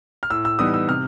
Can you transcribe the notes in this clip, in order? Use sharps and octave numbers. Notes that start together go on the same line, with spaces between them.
F6
A2 E6
E6
E3 G3 B3 D#4 D#6
E6
C3 F6